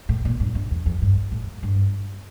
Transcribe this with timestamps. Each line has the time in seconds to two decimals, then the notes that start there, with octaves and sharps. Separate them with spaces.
0.09 A2
0.25 A#2
0.40 G2
0.55 G2
0.71 E2
0.86 F2
1.02 G2
1.32 A2
1.63 G2